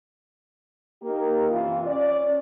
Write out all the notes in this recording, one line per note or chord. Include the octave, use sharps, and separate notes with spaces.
A#3 D#4 G4 A#4
F#2 C3 E3 F4
C#4 D5